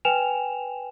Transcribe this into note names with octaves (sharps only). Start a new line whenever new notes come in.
B4 G5 G#5 E7 F7